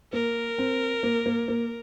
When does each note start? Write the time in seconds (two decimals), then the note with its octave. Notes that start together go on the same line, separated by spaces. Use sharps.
0.13 A#3 A#4
0.58 C4
1.03 A#3
1.26 A#3
1.48 A#3